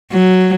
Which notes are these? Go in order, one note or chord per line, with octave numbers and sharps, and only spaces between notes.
F#3